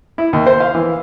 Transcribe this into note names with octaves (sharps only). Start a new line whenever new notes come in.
E4
D#2
C5
F5
E3